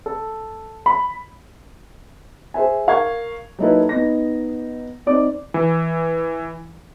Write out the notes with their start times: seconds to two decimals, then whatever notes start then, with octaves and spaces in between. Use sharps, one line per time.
0.06 A4
0.86 B5
2.54 G#4 C5 E5 G#5
2.87 A#4 F5 C#6 G#6
3.59 F#3 A#3 D#4 E4 A4 B4
3.89 B3 D#4 A#6
5.06 C4 D#4 D5 D6
5.54 E3